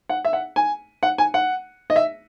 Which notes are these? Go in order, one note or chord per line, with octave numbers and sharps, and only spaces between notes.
F#5
E5
F#5
G#5
F#5
G#5
F#5
D#5
E5